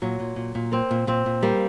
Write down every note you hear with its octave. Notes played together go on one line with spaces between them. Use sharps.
A#2 F#3
A#2
A#2
A#2
A#3 C4
A#2
A#2 C4
A#2
G3 A#3